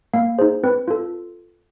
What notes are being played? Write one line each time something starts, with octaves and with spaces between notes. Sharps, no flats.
A#3 F5
D#4 G#4 C5
C4 B4
F4 A4